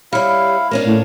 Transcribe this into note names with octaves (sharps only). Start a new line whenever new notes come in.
G3 E4 C#5 F5
A#3 C#4 D4
A2